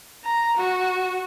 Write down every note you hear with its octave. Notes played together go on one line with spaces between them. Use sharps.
A#5
F#4